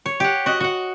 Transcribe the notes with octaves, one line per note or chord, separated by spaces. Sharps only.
C#5
G4 F#5
F#4 D#5 F#5
F#4 F#5